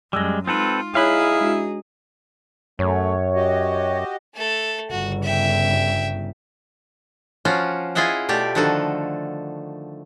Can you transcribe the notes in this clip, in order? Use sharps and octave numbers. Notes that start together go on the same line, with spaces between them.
F#2 G3 G#3 E6 F#6 A#6
G#3 C4 D#4 F4 A4 B4
D#4 E4 G#4 C#5 F5 B5 F#6
G#3 D4 F#4
F#2 A3 C#5
F#4 G4 D#5
A3 A4
G1 C#3 F#4
E5 G5
F3 C#4 F4 F#4
E4 F4 G#4 D#5 E5 F#5
B2 A3 G4 D5
D3 D#3 F3 F#4 A4